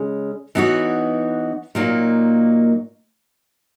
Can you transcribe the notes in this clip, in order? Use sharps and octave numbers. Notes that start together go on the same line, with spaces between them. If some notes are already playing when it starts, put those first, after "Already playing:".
Already playing: C#3 G#3 C#4
E3 B3 D#4 F#4 C#5
A#2 F#3 A#3 D#4